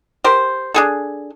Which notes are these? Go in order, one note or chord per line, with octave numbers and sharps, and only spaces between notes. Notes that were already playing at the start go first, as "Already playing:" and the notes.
G4 A#4 C5
D4 G#4 A4